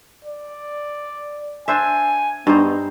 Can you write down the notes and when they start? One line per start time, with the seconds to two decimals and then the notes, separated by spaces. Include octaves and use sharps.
0.25 D5
1.68 D4 C5 E5 G#5
2.47 G2 B3 D#4 C5